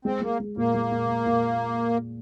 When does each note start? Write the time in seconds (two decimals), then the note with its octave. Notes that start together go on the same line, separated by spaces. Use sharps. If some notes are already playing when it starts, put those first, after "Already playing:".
0.05 G#3 C4
0.22 G#3 A#3
0.40 G#3
0.57 A#2 A#3
0.74 G#3
0.91 A#2
1.08 A#2
1.26 A#2